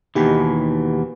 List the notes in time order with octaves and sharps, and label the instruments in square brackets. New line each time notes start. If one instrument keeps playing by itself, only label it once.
[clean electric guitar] D#2 B2 E3 [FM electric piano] D#4 G4